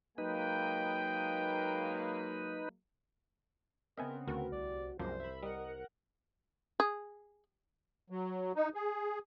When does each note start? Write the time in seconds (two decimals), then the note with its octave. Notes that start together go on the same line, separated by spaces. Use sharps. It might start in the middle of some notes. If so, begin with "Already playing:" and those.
0.18 F#3 G#3 A#3 D#4 B4 G5
3.98 C#3 B3 C4 A#4 D#5 E5 G#5
4.28 D2 F#4 A#4
4.52 C2 C3 D5
4.99 C2 F#2 F3 G#3 A#3 C5
5.20 E5 B5
5.43 G3 A#4 D#5 F#5
6.80 G#4
8.10 F#3
8.56 D#4
8.74 G#4